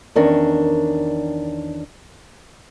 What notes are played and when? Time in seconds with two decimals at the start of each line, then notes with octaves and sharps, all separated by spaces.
0.16 E2 D#3 C#4 D4 A#4